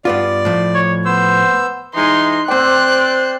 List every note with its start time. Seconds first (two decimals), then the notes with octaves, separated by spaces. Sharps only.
0.05 G2 B3 F4 D5
0.45 A2 F3
0.74 C#5
1.05 B3 C5 E6
1.95 E3 G#3 D#4 C6
2.48 C4 C5 D5 G5 F#6